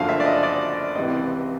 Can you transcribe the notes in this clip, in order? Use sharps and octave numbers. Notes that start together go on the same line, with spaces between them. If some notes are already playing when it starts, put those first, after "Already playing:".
Already playing: F#1 F#2 D3 F3 F5
E5
D5
D#5
D5
C#2 C3 E3 D#5